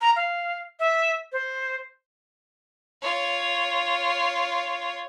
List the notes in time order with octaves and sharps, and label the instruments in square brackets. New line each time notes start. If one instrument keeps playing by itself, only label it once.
[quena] A#5
F5
E5
C5
[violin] F4 C#5